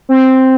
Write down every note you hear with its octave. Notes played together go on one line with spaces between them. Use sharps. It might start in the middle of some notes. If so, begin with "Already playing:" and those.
C4